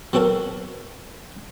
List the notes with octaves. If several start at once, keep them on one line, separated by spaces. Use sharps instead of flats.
F#3 C4 F#4 A4 A#4